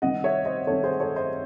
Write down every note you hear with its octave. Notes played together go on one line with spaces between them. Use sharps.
C2 C3 D#3 D#5 F#5
C#5 E5
C5 D#5
C2 C3 D#3 A4 C#5
G#4 C5
A4 C#5
C5 D#5